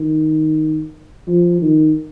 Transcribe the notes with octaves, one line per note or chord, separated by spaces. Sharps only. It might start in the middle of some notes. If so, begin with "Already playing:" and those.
Already playing: D#3
F3
D#3